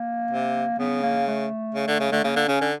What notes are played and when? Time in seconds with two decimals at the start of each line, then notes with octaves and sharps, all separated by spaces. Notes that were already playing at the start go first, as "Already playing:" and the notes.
Already playing: A#3
0.31 C3
0.79 C#3 B3
1.03 A#3
1.27 A3
1.75 C#3
1.88 D3
2.00 C#3
2.11 D3 A3
2.24 C#3 A#3
2.36 D3
2.47 C#3 C#4
2.61 D3